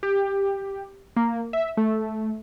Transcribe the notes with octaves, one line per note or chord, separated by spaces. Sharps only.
G4
A#3
E5
A3